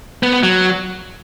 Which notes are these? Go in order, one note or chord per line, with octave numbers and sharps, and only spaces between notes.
B3
B3
F#3